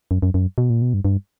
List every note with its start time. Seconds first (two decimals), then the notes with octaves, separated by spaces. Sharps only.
0.11 F#2
0.22 F#2
0.34 F#2
0.58 B2
0.70 A#2
0.82 B2
0.94 G2
1.05 G2